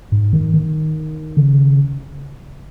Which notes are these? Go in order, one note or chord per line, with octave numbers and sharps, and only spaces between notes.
G#2
D#3
D#3
C#3